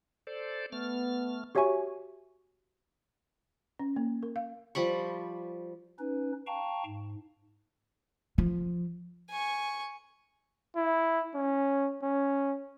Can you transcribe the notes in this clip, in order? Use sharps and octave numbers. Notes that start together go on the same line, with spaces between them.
A4 C5 D5
A3 B3 F6
F#4 G4 C#5 E5 G#5 C#6
C#4
A#3
A#4
F5
F3 G3 B5 C#6
C#4 D#4 B4
F5 G5 A5 A#5 C#6
G#2
F3
G#5 C#6
E4
C#4
C#4